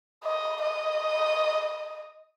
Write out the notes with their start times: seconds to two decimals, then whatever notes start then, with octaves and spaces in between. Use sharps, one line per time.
0.24 D#5
0.62 D#5